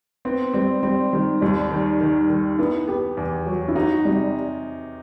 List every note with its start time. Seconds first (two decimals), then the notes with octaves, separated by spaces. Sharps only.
0.25 B3 C4
0.53 G3 C4
0.83 G3 C4
1.12 D#3 G3
1.41 D#2 G3
1.70 D#3
2.00 D#3
2.29 D#3
2.58 B3 E4
2.88 B3 G4
3.17 E2
3.46 F#3
3.68 E4
3.76 D#4 F#4
4.04 C3 G3